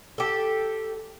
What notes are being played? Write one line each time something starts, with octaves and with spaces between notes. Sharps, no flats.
G4 A4